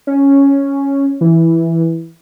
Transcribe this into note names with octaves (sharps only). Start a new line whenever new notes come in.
C#4
E3